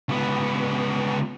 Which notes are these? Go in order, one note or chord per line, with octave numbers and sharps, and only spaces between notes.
C#2 B3